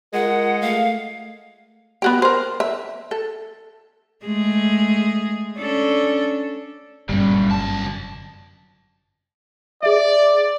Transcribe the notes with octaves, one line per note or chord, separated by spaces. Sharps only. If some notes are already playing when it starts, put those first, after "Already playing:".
G#3 F4 A#4 F#5
A3 F5
B3 F#4 G4
A#4 C5
E5
A4
G#3 A3 G#4
C#4 D4 A4
G1 F#2 A#2 G3
C2 A5
G#4 D5 E5